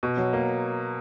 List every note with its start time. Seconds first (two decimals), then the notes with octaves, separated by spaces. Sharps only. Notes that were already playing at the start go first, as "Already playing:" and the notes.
0.03 B2
0.17 F#3
0.33 A#3